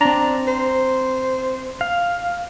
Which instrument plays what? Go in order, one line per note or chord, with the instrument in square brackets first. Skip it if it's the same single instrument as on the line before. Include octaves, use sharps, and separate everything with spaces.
[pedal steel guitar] C4 A#5 [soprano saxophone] D4
[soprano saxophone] C5
[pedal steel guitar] F5